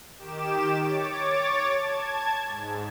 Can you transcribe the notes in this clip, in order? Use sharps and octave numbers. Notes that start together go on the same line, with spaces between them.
D#3 G4 D6 E7
C#5 D6 A6
A5 G#6
G#2